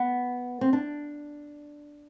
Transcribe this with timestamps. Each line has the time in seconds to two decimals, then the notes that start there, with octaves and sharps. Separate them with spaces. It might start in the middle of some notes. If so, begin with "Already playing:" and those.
Already playing: B3
0.61 C4
0.73 D4